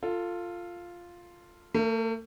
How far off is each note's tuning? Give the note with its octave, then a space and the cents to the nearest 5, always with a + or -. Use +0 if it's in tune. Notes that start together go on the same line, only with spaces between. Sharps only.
F4 +0 A4 +20
A3 +40 A#4 +0